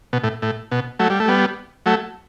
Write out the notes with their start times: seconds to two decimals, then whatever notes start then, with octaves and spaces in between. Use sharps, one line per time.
0.13 B2
0.24 A2
0.42 A2
0.71 B2
0.99 F#3 A3
1.10 G3
1.20 A3
1.28 G3 B3
1.86 F#3 A3